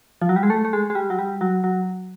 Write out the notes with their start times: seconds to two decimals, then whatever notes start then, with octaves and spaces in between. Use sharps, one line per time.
0.22 F3
0.29 F#3
0.36 G3
0.43 G#3
0.50 A3
0.65 A3
0.73 G#3
0.90 G#3
0.95 G3
1.10 F#3
1.19 G3
1.41 F#3
1.64 F#3